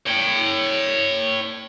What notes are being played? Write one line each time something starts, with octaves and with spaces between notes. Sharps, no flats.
C#5 G5